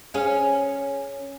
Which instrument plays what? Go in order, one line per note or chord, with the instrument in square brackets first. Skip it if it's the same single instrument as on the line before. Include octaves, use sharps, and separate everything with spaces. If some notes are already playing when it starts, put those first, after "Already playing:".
[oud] C#4 G#4 F5